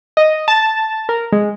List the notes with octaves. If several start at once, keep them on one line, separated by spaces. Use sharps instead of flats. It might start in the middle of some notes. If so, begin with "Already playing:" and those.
D#5
A5
A#4
G#3